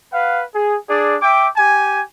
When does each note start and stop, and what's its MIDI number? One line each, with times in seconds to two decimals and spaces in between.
0.13 0.43 71
0.13 0.43 77
0.13 0.43 78
0.55 0.77 68
0.89 1.16 62
0.89 1.16 68
0.89 1.16 74
1.22 1.48 76
1.22 1.48 79
1.22 1.48 86
1.57 2.01 67
1.57 2.01 80